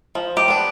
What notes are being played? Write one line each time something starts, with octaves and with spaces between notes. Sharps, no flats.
F3
G4
B3 D4